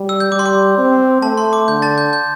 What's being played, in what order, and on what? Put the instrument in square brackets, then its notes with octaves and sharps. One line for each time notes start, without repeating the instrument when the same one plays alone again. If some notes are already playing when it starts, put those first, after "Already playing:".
Already playing: [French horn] G3
[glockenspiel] E6
G6
[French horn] G3 [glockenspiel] D6
[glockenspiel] C6
D6
[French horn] C4
[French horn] A3 [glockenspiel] A5
[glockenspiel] C6
D6
[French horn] D3 [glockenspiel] G6
[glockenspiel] A5 A6
G6
G6